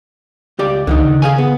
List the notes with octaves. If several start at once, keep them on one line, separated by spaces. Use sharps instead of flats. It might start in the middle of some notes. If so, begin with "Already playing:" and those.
C#2 G4 D5
C#2 D3 D#3 D#4
C#3
G#4 F5 G#5
B3